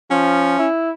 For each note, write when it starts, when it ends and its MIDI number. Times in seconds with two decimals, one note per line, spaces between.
0.11 0.57 53
0.11 0.67 61
0.59 0.91 64